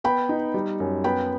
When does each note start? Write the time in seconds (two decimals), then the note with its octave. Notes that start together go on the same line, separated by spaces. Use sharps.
0.04 B3 G5 B5
0.29 D#4
0.54 G3
0.80 F#2
1.04 B3 G5 B5